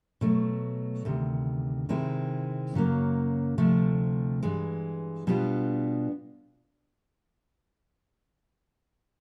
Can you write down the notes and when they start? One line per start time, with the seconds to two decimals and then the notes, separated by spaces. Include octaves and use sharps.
0.21 B2 F#3 A3
1.05 D2 C3 D#3
1.89 C3 D#3 G#3 C4 E4
2.74 F#2 C#3 F#3 A#3
3.58 D2 C3 F3 A3
4.43 G2 E3 G#3
5.27 B2 G3 B3 D4 F4